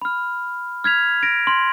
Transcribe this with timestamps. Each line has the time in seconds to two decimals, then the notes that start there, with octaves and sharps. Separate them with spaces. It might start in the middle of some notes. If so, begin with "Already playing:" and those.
0.02 B5 F6
0.84 F6 G#6 B6 F7
1.23 A#6 D7
1.47 C6